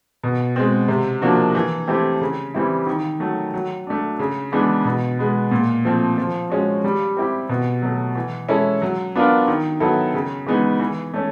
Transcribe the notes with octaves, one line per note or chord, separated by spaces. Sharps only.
B2
G#3 C4
C3
F3 A#3 D4 F#4
E3
A3 C4 E4 G4
C#3
E3 G3 C4 E4
D#3
F#3 A3
F#3
A3 D4
C#3
E3 G#3 B3 D4
B2
G#3 B3
A#2
F3 A3 C4
F3
G#3 C#4 F#4
G3
C4 E4 G4
B2
F#3 A3
E3
G#3 C#4 E4 A4
F#3
B3 D4 F4 A#4
D#3
F#3 B3 E4 A4
C#3
E3 G#3 B3 D#4
E3
A3 C#4